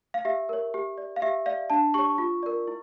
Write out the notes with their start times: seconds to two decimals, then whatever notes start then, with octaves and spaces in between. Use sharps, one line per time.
0.14 F5
0.25 G4 E5
0.49 A#4 C#5
0.74 G4
0.98 D5
1.16 F5
1.22 G4 E5
1.46 D5 F5
1.70 D4 A5
1.94 G4 C#5 C#6
2.18 F4
2.43 A#4 D5
2.67 E4